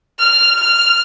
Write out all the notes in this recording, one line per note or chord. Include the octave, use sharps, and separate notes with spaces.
F6
F6